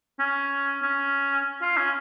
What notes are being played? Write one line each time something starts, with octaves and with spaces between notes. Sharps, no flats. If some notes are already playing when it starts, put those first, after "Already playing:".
C#4
C#4
F4
C#4